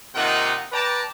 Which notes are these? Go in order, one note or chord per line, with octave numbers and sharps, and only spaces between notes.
C3 D#3 A#3 D#4 F4 F#5
B4 D5 G5 A5 A#5